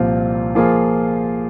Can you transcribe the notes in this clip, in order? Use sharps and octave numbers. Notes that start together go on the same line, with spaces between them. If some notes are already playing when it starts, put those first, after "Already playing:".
Already playing: C2 A#2 F3 C4 F4
F3 A#3 F4 G#4